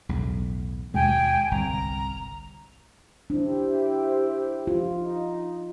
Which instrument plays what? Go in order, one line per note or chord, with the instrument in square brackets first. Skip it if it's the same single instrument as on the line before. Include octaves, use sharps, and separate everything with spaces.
[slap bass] B1 E2 A2
[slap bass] D#2 B2 G#3 [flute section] G5 G#5
[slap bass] G1 C2 [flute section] A#5
[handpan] D4 [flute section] E4 G4 C5
[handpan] F4
[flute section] D#4